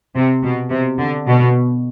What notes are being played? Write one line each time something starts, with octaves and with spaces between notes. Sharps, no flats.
C3
B2
C3
D3
B2